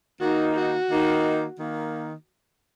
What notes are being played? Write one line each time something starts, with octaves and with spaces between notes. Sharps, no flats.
D#3 A#3 D#4 F#4
F#4
D#3 A#3 D#4
D#3 A#3